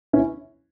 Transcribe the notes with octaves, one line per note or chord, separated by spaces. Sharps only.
C#4 E4